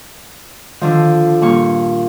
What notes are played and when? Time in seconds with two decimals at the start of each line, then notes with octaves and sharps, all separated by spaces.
0.82 D3 D#3 F3
1.42 G2 A#2 C#6